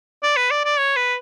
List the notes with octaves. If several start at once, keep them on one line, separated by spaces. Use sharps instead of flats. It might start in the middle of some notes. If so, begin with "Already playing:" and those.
D5
B4
D5
D5
C#5
B4